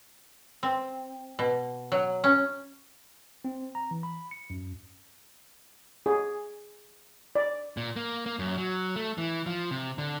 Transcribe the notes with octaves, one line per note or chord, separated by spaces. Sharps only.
C4
B2
F#3
C#4
C4
A#5
E3
B5
C#7
F#2
G#4
D5
A#2
A#3
A#3
F#2
F#3
A3
E3
F3
C3
D3